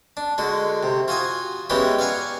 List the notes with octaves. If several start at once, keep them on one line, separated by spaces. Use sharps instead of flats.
D4
D3 G#3 F#4
C3
F4 F#4 G#5 D#6
E3 G#3 B3 C#4 F#4 G4
D5 F5 F#5 G#5 C#6